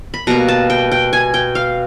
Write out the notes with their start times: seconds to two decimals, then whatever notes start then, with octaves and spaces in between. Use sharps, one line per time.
0.14 B5
0.27 B2 G3 A#3 A#5
0.48 A5
0.70 G5
0.92 G5
1.13 G#5
1.34 G5
1.55 F5